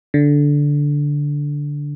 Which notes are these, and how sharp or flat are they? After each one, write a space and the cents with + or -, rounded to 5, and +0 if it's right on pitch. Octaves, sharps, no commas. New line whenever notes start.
D3 -10